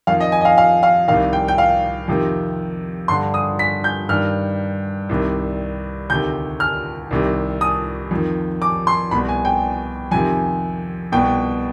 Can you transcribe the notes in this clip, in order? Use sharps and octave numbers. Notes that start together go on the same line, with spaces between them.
F2 D#3 F5
D#5
G#5
D#5
F5
F5
F5
C2 C3 D#3 F5
G5
G5
F5
F2 C3 D#3
G2 D3 C6
D#6
B6
G6
G2 D#3 F6
C2 C3 D#3
D2 C3 D#3 G6
F6
C2 C3 D#3
D#6
F2 D#3
D6
C6
C2 B2 B5
G#5
G5
F2 C3 D#3 G#5
C2 B2 G5